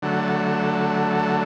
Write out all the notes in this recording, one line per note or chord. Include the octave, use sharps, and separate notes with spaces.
D3 F#3 A3